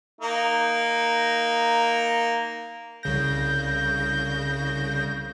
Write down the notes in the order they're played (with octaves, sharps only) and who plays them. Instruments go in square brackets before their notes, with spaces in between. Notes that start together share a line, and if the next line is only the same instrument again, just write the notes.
[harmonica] A#3 D#4
[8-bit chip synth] C2 C#3 A#6 [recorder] G6